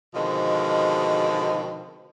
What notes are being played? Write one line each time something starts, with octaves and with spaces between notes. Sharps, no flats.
B2 D3 D#3 F3 G#3 C4